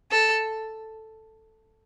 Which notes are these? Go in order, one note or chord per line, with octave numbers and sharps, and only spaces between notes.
A4